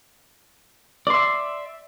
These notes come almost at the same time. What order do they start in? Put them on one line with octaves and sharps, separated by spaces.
D5 C6 E5